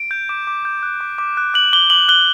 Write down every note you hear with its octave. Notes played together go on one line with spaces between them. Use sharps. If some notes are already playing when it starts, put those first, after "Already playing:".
Already playing: D7
G6
D6
D6
G6
F#6
D6
D6
F#6
F#6 F#7
D6 G7
D6 F#7
F#6 G7